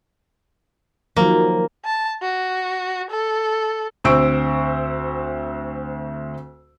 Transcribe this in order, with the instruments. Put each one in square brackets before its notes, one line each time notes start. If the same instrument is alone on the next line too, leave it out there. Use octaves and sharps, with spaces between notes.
[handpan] D#3 F3 F#3 [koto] A#3
[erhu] A5
F#4
A4
[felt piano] D2 C4 C5 C#6 E6 D7